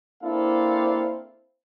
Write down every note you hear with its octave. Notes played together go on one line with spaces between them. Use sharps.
A#3 C4 D4 E4 A4 F5